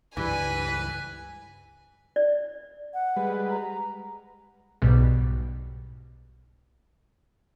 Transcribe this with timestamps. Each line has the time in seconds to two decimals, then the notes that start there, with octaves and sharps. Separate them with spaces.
0.17 C#2 G2 E3 G3 B4 G#5
2.16 D5
2.94 F#5
3.16 G3 G#3 B4
3.50 A#5
4.82 B1 G#2 B2 G3